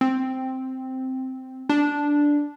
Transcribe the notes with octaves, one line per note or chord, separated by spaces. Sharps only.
C4
D4